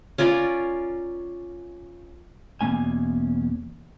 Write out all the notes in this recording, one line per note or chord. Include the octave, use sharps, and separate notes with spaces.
C#4 F4 A#4 D5
E2 B2 A#3 C#4 G#5